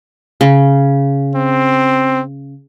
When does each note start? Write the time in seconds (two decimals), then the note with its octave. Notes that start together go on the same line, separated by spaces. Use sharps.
0.41 C#3
1.35 C4